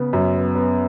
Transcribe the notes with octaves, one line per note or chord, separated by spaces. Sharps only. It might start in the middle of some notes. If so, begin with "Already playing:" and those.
Already playing: C#3 B3
F#2
B3
B3